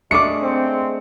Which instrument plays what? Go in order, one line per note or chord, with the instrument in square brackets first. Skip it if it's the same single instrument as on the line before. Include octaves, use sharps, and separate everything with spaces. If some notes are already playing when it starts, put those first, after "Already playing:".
[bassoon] G#3 [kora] A3 D4 [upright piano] D6 D#6 C#7
[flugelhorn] C4